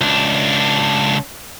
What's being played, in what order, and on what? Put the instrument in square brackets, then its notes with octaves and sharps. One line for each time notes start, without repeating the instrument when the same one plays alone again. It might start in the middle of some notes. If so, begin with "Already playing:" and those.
[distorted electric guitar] C#2 D4